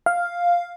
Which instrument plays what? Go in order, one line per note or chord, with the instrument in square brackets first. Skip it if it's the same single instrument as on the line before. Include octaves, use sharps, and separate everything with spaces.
[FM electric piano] F5